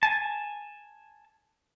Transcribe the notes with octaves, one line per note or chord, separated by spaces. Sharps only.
G#5 A5